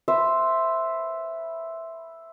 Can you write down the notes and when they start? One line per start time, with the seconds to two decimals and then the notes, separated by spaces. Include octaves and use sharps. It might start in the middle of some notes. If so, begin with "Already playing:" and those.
0.08 B4 C5 E5